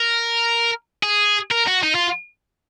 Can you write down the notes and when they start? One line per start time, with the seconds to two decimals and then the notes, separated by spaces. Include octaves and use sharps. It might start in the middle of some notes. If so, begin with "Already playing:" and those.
Already playing: A#4
1.03 G#4
1.51 A#4
1.68 F#4
1.83 D#4
1.95 F4